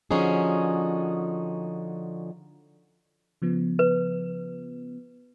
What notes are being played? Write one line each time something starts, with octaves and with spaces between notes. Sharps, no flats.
D3 F3 C#4 D#4 F#4 G#4
C#3 F3 B3
B4